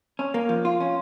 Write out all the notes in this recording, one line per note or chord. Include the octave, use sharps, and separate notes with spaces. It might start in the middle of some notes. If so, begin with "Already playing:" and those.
C#4
A#3
F3
F4
C#4